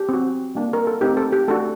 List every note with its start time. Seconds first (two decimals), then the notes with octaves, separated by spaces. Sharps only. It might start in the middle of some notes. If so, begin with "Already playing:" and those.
Already playing: G4
0.09 C4 F#4
0.55 G3 A#3 D4
0.73 A#4
0.87 A4
1.01 A3 C4 D#4 G4
1.17 A4
1.33 G4
1.48 A3 D4 F#4 A4